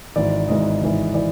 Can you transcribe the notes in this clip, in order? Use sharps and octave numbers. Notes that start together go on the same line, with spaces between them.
G#1 G#2 E3 D5
G#1 G#2 E3 D#5
G#1 G#2 E3
E3 D5